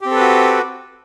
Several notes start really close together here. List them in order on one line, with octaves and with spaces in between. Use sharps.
G4 C4 A4 B4 F#4